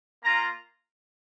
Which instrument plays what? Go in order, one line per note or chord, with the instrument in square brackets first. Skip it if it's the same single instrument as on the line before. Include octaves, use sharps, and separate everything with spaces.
[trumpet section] A#3 F4 A#5